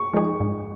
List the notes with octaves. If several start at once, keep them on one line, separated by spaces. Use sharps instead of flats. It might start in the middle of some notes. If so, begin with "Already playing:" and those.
Already playing: C#6
F3 G#3 D#4 G#4
G#2